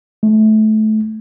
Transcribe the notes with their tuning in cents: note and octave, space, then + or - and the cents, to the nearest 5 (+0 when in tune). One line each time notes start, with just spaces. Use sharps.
A3 -25